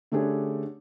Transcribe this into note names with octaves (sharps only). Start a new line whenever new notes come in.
D3 A3 C#4 D4 G4 G#4